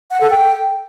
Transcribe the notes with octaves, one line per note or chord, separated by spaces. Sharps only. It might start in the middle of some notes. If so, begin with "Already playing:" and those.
F#5
A4
G5